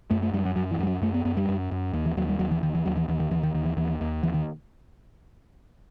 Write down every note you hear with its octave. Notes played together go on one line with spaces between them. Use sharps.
F#2 A3
A3
F#2 G3
F#3
F#2 F#3
E3
F#2 G3
F#3
F#2 A3
B3
F#2 B3
G3
F#2
F#2
D#2
E3
D#2 F#3
G3
D#2 F#3
E3
D#2 D#3
E3
D#2 F#3
E3
D#2 E3
D#3
D#2 E3
D#3
D#2 D#3
E3
D#2 E3
D#2
D#2 E3
D#3